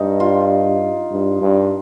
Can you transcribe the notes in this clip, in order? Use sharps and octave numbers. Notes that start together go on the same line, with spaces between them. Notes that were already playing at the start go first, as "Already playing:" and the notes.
Already playing: G2 D#4
F4
G2
G2